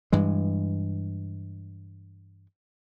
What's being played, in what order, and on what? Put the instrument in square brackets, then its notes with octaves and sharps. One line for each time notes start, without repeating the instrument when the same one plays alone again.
[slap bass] G2 E3 G#3